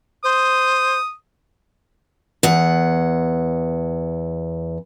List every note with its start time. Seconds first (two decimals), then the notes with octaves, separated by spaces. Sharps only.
0.24 C5 D#6
2.43 E2 F#5